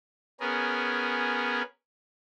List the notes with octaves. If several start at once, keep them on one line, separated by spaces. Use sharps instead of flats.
B3 C#4 G#4 A#4